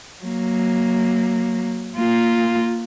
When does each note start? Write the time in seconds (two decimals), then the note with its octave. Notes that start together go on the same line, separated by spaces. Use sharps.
0.22 F#3 A#3
1.96 A#3 F4